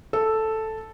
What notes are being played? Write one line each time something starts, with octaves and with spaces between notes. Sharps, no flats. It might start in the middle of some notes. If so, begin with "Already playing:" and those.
A4